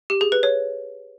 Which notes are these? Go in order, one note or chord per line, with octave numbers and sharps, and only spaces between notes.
G4
G#4
B4
C#5